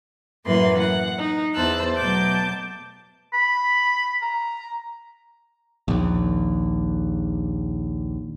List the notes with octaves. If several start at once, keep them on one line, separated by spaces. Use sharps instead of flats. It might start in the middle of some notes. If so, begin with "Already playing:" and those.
F#2 A2 E3 A#3 B4 C6
F#5
D#4
E2 C5 A5 E6 F#6
B2 F#3 A3 A5 D6 G6
B5
A#5
A#1 D#2